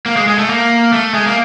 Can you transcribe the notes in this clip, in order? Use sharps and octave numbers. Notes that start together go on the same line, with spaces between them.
A#3
G#3
G#3
A3
A#3
A3
G#3
A#3